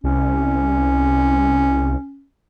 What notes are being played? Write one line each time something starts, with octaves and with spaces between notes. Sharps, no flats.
C2 C#4